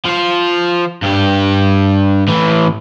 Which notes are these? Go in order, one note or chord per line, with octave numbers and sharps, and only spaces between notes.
F3 F4
G2 G4
A2 E3